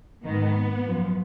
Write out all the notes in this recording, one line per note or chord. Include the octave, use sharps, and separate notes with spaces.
G#2 D#3 B3
F#2 F3